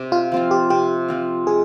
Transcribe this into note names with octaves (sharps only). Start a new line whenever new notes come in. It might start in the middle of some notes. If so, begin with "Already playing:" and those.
Already playing: C3
F4
F3 C4 F4
G4
C3 G4
F3 C4 F4
G#3 G#4